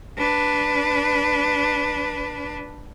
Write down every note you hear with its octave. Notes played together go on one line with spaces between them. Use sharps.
D4 B4